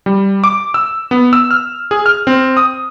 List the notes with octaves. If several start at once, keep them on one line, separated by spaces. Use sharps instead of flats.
G3
D6
E6
B3
E6
F6
G#4
F6
C4
D#6